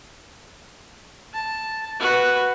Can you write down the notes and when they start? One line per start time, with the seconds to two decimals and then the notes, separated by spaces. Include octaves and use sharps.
1.33 A5
2.00 F#4 B4